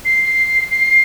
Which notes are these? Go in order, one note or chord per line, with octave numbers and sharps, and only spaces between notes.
C7
C7